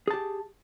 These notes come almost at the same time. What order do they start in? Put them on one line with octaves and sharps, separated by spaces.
G#4 A5 G4